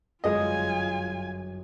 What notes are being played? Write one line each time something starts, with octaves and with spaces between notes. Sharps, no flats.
G1 F#2 G#3 F4 D#5 G#5